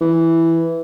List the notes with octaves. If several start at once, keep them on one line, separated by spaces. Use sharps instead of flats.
E3